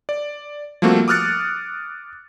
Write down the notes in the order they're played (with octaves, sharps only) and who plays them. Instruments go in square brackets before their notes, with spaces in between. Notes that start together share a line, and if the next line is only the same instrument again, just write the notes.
[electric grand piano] D5
F3 G3 A3 A#3 C4 F#4
D6 D#6 F6 F#6 A6 C#7